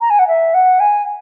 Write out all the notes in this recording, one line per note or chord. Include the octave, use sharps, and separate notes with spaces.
A#5
G#5
F#5
E5
F#5
G#5